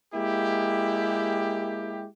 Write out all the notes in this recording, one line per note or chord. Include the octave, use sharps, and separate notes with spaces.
G#3 A#3 E4 G4